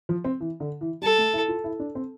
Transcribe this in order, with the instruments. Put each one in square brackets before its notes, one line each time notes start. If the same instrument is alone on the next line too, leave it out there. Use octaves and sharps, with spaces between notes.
[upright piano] F3
C4
E3
D3
E3
[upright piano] G3 [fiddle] A4
[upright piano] A3
E4
F4
E4
D4
C4